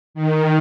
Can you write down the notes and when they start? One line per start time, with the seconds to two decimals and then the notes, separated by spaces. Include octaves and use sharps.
0.14 D#3